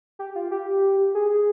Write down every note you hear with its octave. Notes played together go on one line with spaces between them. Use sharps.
G4
F4
G4
G#4